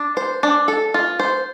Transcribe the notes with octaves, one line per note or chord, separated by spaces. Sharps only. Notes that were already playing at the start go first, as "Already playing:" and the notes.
Already playing: D4
C5
D4
A4
F4
C5